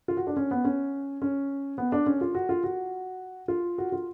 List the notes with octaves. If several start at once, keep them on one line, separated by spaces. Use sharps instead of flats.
F4
F#4
D4
C#4
B3
C#4
C#4
B3
D4
C#4
F4
F#4
F4
F#4
F4
F#4
F4